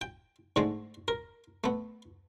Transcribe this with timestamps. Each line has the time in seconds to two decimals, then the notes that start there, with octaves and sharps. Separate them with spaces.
0.01 G5
0.56 G#2 D3 G#3 A3
1.08 A#4
1.64 A3 B3